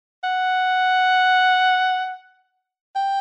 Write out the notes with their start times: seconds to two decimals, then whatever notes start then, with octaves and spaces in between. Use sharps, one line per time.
0.24 F#5
2.95 G5